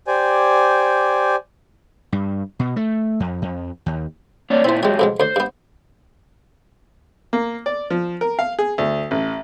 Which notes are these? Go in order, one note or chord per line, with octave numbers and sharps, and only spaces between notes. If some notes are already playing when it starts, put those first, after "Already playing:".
G4 C5 D5 G#5
G2
B2
A3
F2
F2
D#2
A#3 C#5 D5
A#2 C4 E4 C5
G#2 F#3 G#3 G4 C#5
F2 B2 G#3
D2 C5 C#5
G2 B3
A#3
D5
F3
A#4
F5
G#4
D2
A1